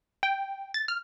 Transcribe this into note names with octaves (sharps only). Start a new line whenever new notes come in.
G5
A6
F6